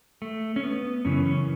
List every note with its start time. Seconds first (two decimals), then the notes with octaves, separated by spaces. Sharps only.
0.22 A3
0.56 C#4
0.63 B3
1.05 F#2 C#3 E3 C#4
1.25 C#4